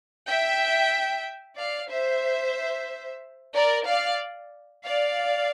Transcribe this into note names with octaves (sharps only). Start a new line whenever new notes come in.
E5 G5
D5 F5
C5 E5
A#4 D5
D5 F5
D5 F5